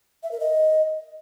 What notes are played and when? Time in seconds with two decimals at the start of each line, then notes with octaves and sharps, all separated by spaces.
0.23 E5
0.32 A#4
0.40 D#5